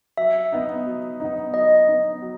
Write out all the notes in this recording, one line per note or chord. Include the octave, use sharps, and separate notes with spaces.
F#3 E5
B3 D#4
F#3
B3 D#4
F#3 D#5
B3 D#4
F#3